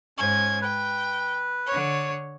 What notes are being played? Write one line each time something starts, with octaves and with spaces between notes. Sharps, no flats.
G#2 C#4 C5 G#6
B4 G5
D3 C#5